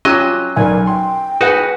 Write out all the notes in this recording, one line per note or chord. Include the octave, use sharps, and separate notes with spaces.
F#3 C#4 F4 G4 D#5 E6
B1 A#4 D5 G#5
G5 C6
D#4 F#4 G#4 B4 F#5 G#5